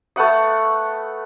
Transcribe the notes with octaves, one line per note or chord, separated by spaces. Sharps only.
A3 B3 F#5 D#6